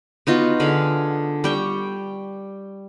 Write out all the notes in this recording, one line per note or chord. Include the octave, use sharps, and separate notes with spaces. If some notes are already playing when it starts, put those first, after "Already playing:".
B3 D#4 F4 F#4
D3 G#4 F5 B5
G3 G5 C#6